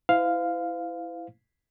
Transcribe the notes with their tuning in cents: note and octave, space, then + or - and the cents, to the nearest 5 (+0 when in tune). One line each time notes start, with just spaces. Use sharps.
E4 +0 C5 -45 F5 +0